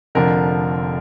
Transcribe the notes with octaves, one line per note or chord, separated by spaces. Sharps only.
F1 F2 D3 F3 A#4